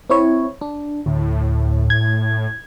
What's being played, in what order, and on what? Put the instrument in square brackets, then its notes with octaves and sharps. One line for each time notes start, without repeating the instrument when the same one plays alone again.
[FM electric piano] C4 E4 C#5
D4
[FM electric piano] D2 [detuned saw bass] A2
[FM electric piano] G#6